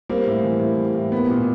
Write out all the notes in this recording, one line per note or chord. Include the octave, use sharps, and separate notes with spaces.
G3 A#3 C4
A2
E3
A2
G3
A2
A#3 B3
A#2